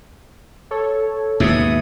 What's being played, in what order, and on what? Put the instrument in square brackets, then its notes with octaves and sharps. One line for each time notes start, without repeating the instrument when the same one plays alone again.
[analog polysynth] A4 C#5
[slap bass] D#2 G#2 B2 [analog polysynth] E5 D#6